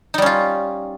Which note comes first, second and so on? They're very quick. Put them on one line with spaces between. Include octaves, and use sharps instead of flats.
D#4 G3 C#4 F4